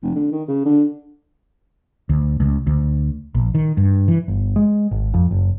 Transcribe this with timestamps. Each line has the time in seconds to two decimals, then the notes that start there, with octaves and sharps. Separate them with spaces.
0.03 F1
0.15 D3
0.32 D#3
0.48 C#3
0.65 D3
2.09 D2
2.40 C#2
2.67 D2
3.35 A#1
3.55 D#3
3.77 G2
4.08 E3
4.28 G1
4.56 G#3
4.91 G#1
5.14 F2
5.31 F#1